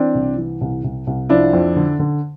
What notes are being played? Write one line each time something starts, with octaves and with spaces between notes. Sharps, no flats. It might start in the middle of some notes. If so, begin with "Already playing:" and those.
Already playing: E3 C4 D4
C2
E3
C2
C2
C2
F3 D4 E4
F2
D3
D3